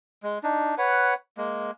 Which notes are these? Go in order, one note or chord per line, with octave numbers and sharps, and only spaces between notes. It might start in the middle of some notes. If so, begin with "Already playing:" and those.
G#3
D4 D#4
B4 C#5 F#5
G#3 A#3